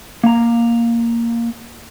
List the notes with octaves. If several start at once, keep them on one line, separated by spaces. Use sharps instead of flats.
A#3 A#5